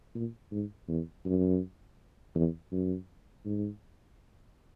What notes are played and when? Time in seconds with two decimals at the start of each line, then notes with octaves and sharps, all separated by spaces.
0.15 A#2
0.51 G#2
0.88 E2
1.25 F#2
2.35 E2
2.72 F#2
3.45 G#2